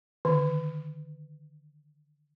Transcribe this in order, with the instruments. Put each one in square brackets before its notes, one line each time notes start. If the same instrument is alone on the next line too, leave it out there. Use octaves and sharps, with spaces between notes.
[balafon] D3 D#3